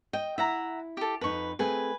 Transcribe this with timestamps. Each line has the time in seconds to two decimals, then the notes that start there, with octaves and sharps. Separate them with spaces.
0.13 D#5 G5
0.38 E4 E5 F#5 A#5
0.97 G4 A4
1.21 F2 D#4 B4 C#6
1.59 A3 C4 G#4 B4 G#5